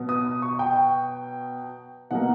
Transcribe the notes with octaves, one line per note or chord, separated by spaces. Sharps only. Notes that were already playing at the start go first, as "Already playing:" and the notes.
Already playing: B2 F#3 B3
D#6
C#6
G5
B2 F#3 A#3 F#5